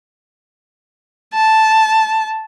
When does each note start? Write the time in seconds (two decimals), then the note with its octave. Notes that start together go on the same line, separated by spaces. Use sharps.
1.34 A5